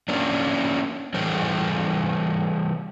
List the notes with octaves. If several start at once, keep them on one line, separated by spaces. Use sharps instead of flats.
A#3 C#4 D4
E3 G3 G#4 A#4 C5